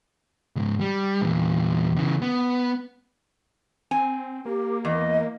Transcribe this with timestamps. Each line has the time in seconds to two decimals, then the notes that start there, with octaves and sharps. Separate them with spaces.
0.56 C#2 G#2
0.80 G3
1.22 E2 A#2
1.96 C#3 E3
2.22 B3
3.91 C4 G#5
4.45 A#3 G4
4.85 E2 D#5